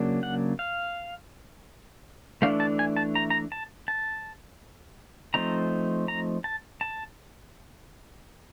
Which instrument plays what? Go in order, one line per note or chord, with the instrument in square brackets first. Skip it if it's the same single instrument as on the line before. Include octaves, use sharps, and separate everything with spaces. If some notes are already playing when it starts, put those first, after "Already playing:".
Already playing: [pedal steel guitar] C#3 F#3 A#3 D4
F#5
F5
E3 A3 D4 F5
A5
G#5
A5
A#5
A#5
A5
A5
F3 A3 C4 D#4 A#5
A#5
A5
A5